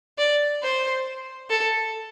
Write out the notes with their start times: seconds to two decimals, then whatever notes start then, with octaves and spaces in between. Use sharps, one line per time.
0.18 D5
0.63 C5
1.50 A4